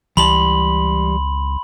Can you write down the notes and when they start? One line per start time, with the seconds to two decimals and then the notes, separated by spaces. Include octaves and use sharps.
0.17 C#2 E3 G3 A5 B5 C6 F#7